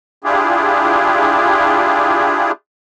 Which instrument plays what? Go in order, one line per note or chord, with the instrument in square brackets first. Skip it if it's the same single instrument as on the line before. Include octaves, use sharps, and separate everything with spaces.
[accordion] D4 E4 F4 G4 G#4